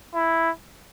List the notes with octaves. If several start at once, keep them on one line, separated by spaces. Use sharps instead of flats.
E4